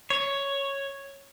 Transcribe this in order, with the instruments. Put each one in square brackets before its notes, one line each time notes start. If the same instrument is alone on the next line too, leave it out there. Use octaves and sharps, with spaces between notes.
[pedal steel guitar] C#5